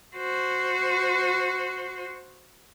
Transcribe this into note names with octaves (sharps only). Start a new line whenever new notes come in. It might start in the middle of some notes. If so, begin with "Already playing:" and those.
F#4 C5